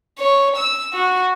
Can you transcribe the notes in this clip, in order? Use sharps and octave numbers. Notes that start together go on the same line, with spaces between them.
C#5
E6
F#4